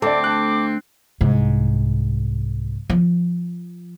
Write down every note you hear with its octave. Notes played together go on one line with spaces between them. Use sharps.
D2 A3 C4 A4 D5 D6
A5 F#6
C2 G#2
F3